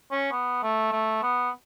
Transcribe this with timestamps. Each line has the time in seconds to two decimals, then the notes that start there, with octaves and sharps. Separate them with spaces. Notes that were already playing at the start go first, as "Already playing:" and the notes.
0.11 C#4
0.32 B3
0.63 A3
0.92 A3
1.23 B3